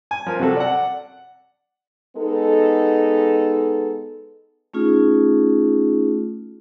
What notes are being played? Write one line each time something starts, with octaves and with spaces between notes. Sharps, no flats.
G#5
F3 A#4
C3 F#3 F#4 A4
D5 F#5
G#3 B3 D#4 A4
A3 C#4 D#4 F4 G#4